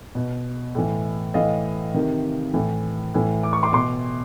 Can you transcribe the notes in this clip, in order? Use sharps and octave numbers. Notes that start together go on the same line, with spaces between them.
B2
A2 E3
A2 E3 D#5 F5
C3 D#3
A2 E3
A2 E3
D6
C#6
C6 D6
B2 C6 D6